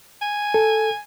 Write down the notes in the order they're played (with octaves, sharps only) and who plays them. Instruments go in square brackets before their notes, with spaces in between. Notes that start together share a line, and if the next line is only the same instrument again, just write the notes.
[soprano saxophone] G#5
[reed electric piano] A4